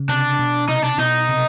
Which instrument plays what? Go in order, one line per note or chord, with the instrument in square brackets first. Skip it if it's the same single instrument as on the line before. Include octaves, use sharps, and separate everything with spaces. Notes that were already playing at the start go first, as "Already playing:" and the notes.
Already playing: [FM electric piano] C#3
[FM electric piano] C3 [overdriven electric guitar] D4
[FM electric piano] B2
[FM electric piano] C3 [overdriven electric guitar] D#4
[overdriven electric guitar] D4
[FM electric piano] B2 [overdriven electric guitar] D#4
[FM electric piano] C3